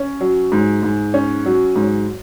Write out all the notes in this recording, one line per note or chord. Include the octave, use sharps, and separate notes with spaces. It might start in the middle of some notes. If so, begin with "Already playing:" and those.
Already playing: C#4
F#3
G#2
G#2
C#4
F#3
G#2